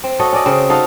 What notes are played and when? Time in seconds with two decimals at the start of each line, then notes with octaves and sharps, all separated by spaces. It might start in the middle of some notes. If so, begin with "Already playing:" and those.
0.04 C4
0.19 F#4 A4 C#5 D#5
0.33 C#4 D5 D#5
0.45 C#3 C4
0.70 D#4 F#4 A4 F5